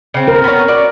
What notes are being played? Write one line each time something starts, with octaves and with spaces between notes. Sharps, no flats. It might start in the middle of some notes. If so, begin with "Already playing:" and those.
C#3 C4
A#4
B3 C#4
F#4 D5